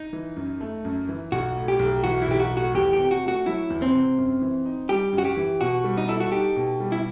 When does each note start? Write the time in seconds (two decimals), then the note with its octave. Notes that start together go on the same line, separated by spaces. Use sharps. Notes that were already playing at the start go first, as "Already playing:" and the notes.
Already playing: D#4
0.13 E3
0.36 F#2
0.61 A3
0.85 F#2
1.09 E3
1.32 B1 F#4
1.56 A2
1.68 G4
1.79 B1
2.04 E3 F#4
2.22 E4
2.28 B1 G4
2.39 F#4
2.52 A2
2.57 F#4
2.74 E2 G4
2.93 G4
2.98 C3
3.11 F#4
3.23 A3 F#4
3.46 F#3 E4
3.70 E2
3.82 C4
3.95 C3
4.18 F#2
4.41 E3
4.66 D#4
4.89 G3 G4
5.13 F#2
5.18 F#4
5.25 G4
5.37 E3
5.61 B2 F#4
5.84 G3
5.97 D#4
6.08 E4 A4
6.20 F#4
6.32 D#4 G4
6.56 B2
6.80 G3
6.92 E4